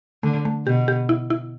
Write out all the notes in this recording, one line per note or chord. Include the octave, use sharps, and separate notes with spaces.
D3 A3
A3
B2 G4
G4
E4
E4